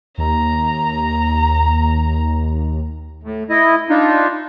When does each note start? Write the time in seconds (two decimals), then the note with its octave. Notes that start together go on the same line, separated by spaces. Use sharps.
0.18 D#2 A#5
3.23 A2
3.50 E4 D#5
3.89 D4 D#4 F4